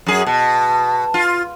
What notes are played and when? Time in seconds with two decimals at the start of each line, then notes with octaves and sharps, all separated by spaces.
0.06 F#2 G#4
0.26 B2 A5
1.14 F4